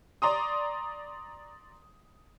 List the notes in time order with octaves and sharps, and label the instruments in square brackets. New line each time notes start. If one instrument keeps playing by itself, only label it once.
[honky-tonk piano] D5 A#5 C6 D#6